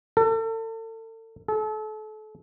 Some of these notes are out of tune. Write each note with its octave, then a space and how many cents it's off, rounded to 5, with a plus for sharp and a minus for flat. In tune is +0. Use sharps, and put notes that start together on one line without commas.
A4 +35
A4 -35